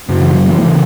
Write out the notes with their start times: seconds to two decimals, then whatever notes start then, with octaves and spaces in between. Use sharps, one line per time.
0.08 F#2 C#3
0.21 E3
0.34 F#3
0.47 E3 A3
0.61 C#3 E3 A3